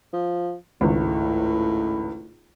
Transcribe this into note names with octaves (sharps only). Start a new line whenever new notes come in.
F3
G#1 C#2 A2